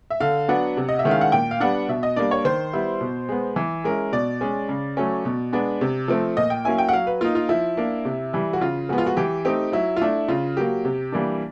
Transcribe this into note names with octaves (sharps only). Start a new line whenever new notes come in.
E5
D3 F5
F#3 B3 D4 F#5
C3
D#5
E5
D#3 G#3 C#4 E4
F5
F#5
A#2 G5
F5
G3 B3 D4 F#5
B2 E5
D#5
G3 A#3 D4 D5
C#5
D#3 C5
G3 B3 E4
B2
G#3 B3
E3
G#3 C#4 E4 A#4
B2 D5
G#3 C#4
C#3
F#3 A3 C#4
B2
G#3 B3 D4
C3
F3 A3 C4
A#2 D#5
G5
F#3 A#3 C#4 E4 G#5
G5
F#5
F#3 F5
B4
A#3 D#4 F4
F4
F3 E4
A#3 D4
C3
E3 G3
F#4
C#3 F4
F3 G#3 B3 F#4
F4
F#4
E3 G4
A3 C4 D#4 G4
F#3 E4
F4
A3 D4 E4
C#3 F4
F#3 A#3 G4
C3
E3 G3 A#3 D4